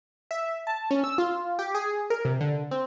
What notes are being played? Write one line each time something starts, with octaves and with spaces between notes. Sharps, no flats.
E5
A5
C#4
E6
F4
G4
G#4
A#4
C3
D3
C4